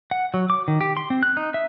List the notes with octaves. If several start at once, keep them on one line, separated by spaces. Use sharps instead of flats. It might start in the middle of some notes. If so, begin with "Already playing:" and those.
F#5
F#3
D6
D#3
G4
C6
C4
F#6
D#4
E5